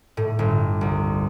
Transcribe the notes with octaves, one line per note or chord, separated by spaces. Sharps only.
A2
G1
C2